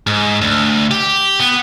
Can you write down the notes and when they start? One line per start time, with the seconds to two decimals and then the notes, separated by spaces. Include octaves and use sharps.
0.07 G#2
0.41 D2
0.91 G4
1.40 B3